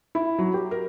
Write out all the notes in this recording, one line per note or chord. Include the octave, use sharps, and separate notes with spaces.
E4
F#3
G4
A#4